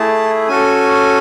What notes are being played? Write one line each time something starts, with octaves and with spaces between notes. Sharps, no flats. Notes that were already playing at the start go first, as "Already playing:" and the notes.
Already playing: A3 E4 G#4 A5
C#4 F#4 A4 G#5